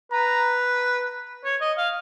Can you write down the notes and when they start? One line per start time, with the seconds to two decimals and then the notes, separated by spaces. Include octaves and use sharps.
0.12 B4 A#5
1.44 C#5
1.61 D#5
1.78 F5